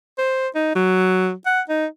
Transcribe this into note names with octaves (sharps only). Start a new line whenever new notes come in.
C5
D#4
F#3
F#5
D#4